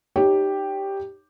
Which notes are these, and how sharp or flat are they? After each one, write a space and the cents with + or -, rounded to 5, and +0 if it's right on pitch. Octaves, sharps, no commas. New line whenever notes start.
D#4 -15 G4 +0 C#5 +0